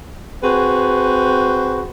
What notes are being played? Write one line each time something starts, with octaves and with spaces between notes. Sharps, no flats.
C4 F#4 G#4 B4